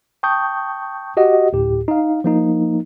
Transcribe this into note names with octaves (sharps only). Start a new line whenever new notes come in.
G5 A5 C#6 D#6 G6
F#4 G4 D#5 F#5
D2 A2 G4
D#4 F5
F3 A#3 D#4